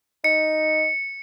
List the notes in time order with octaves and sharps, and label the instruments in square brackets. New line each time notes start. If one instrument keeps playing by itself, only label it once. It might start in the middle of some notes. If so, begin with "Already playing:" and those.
[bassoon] D#4 [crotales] C#7